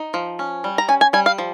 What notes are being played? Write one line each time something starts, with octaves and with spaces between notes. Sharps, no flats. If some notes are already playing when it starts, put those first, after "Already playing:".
Already playing: D#4
F3
C#4
G3
A#5
C#4 G#5
G#5
G3 G#5
F5
F3